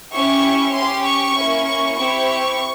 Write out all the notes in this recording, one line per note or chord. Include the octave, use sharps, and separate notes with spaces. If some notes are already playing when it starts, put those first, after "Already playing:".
C#4 E4 G4 C#6
C#4 G4 C6
C#6
A#3 C#4 E4
C#6
C4 E4 G4 C#6